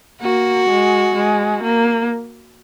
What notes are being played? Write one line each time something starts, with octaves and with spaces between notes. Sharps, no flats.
A#3 F#4
G#3
G#3
A#3